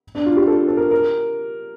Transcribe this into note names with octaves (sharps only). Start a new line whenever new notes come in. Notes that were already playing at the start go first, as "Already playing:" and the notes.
D4
F4
G4
A4
A4
A#4
A#4